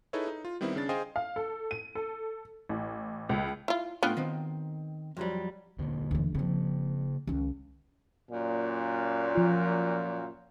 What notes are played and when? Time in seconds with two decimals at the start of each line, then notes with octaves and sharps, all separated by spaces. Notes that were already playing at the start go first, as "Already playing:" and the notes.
0.13 D#4 E4 G#4 A4 B4 C#5
0.28 D#4
0.45 F4
0.61 D#3 G3 B3 C4 E4
0.75 C#3 C#4 D4 A6
0.89 G#4 C5 D#5 F5 G5 G#5
1.16 F5
1.36 A4
1.71 D#7
1.95 A4
2.69 A1
3.29 C#2
3.68 E4 F4
4.03 A2 B3 D4 F4 G5
4.17 D#3 C4
5.17 F2 F#3 G3
5.79 D#1 D3 A#3
6.11 D2 E3
6.35 C#3 F3 A#3 C4
7.27 C#2 D#3
8.30 F#2 A#2
9.35 F3 F4